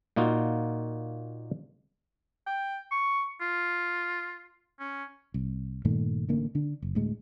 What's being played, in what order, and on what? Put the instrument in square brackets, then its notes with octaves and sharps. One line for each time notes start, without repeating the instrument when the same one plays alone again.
[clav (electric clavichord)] A#2 A#3 D#4 F4 F#4
[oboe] G5
C#6
F4
C#4
[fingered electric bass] C2
G2 A#2 D#3 A3
A1 D3 A#3
D3 D4
F#1
D2 A2 G#3